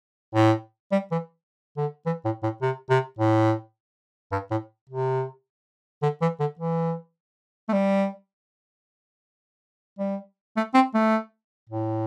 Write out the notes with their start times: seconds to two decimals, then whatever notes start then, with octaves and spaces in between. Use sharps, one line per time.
0.35 A2
0.92 G3
1.11 E3
1.77 D3
2.06 E3
2.25 A2
2.43 A2
2.62 C3
2.90 C3
3.19 A2
4.32 G2
4.51 A2
4.89 C3
6.02 D3
6.22 E3
6.40 D3
6.59 E3
7.69 A3
7.73 G3
9.99 G3
10.56 A3
10.74 C4
10.94 A3
11.70 A2